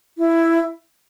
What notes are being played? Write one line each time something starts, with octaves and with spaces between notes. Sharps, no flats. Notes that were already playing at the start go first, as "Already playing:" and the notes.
E4